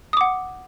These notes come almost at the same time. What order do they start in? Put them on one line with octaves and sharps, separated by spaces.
D#6 D6 F#5